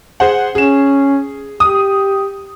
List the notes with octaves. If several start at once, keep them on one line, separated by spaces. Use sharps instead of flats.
G#4 C5 F#5
C#4 G#4 E7
G4 D#6